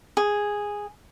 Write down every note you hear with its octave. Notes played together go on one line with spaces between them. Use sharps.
G#4